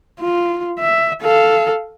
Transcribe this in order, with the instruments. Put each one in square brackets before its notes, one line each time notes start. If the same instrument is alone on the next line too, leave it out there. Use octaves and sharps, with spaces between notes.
[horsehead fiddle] F4
E5
A4 F5